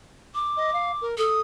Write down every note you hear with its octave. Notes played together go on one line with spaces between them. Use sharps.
D6
D#5
F5
A#4
A4 D#6